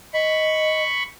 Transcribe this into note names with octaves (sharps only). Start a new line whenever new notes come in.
D#5 B5 C#6